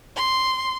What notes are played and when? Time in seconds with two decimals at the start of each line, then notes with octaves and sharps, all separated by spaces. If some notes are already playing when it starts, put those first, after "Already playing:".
0.16 C6